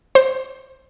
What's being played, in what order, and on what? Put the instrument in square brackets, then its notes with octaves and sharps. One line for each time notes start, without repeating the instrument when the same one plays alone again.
[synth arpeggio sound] C5